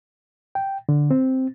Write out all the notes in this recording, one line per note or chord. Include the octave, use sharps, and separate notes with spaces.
G5
D3
C4